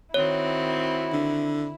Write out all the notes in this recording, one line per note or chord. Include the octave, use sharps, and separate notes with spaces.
D#3 C4 E4 F#4 C#5
D3